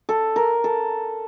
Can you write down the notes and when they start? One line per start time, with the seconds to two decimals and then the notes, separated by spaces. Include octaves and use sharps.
0.09 A4
0.36 A#4
0.64 A4